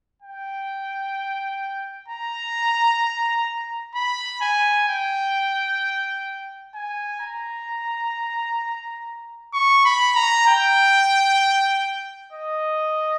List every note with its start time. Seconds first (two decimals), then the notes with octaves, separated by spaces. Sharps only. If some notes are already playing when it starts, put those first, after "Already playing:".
0.22 G5
2.08 A#5
3.95 B5
4.41 G#5
4.88 G5
6.75 G#5
7.20 A#5
9.53 C#6
9.85 B5
10.16 A#5
10.47 G5
12.33 D#5